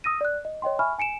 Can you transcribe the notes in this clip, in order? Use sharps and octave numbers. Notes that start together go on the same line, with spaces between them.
D#6 E6 A#6 D#7
D5 F#6
D#5
C#5 D#5 G5 C6
E5 G#5 B5 C#6 F6
G#5 C#7 D7 E7